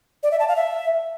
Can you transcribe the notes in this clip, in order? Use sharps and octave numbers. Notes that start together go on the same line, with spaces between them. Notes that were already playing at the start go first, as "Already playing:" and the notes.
D5
E5
A5
F5
E5